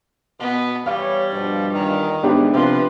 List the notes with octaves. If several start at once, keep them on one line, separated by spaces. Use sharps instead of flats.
B2 B3
E3 G3 C#5 F5
G2 B2 F3
E2 A#2 D#3
G#2 D3 E3 B3 D4 G4
C3 F3 B4